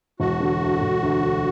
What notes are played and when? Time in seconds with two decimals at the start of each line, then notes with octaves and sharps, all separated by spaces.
0.20 E1 F#4
0.40 D3
0.61 D2
0.81 E1
1.03 D2
1.23 D2